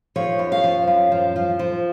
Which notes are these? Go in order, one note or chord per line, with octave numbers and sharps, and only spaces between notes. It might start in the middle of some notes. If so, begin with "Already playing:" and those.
F3 C#5
F#2
F5
F3
F#2
F3
F3
F3